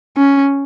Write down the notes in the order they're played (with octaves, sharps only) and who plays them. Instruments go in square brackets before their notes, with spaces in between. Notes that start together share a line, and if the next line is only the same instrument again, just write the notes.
[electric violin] C#4